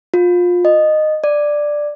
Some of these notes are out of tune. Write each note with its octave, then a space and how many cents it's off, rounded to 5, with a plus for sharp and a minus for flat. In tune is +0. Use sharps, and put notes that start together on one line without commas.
F4 +25
D#5 -15
D5 +5